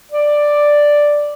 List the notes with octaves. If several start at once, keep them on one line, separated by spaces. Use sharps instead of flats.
D5